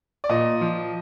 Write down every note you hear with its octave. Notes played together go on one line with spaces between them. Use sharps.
D5
A#2 D#5
F3